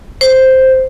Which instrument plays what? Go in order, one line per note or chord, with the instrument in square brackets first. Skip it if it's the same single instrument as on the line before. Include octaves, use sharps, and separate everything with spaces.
[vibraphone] C5